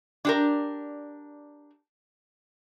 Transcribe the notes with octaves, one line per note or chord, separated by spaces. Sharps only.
D4 G4 A#4